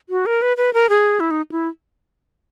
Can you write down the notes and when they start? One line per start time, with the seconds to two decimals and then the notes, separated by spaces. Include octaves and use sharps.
0.09 F#4
0.26 A#4
0.42 B4
0.57 B4
0.74 A#4
0.89 G#4
1.20 E4
1.31 D#4
1.52 E4